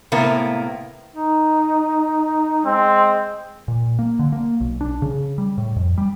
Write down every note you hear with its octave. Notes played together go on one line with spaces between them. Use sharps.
A2 C3 A#3 B3
D#4
G#3 C4
A#2
A#3
D3
A#3
B1
D4
C#3
G3
A2
F2
G3